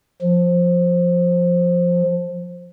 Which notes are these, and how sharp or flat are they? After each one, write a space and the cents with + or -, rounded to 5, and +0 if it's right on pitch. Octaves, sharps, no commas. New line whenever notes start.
F3 +10